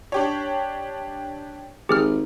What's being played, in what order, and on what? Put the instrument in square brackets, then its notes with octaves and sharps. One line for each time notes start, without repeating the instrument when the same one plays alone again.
[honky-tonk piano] D4 G4 C#5
[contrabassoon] G#1 [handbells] G4 G#4 F6